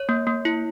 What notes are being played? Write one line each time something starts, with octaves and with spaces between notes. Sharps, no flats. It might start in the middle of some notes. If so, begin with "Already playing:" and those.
Already playing: C#5
A#3
A#3
E4